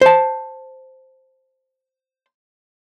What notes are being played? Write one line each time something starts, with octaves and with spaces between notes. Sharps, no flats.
C5 A5